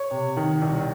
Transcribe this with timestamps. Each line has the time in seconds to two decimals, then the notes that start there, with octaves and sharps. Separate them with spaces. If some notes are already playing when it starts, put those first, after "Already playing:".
Already playing: C#5
0.11 C3
0.37 D#3
0.61 C2